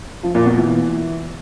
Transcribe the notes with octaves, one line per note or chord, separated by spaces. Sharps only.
F3
A#2
B2
E3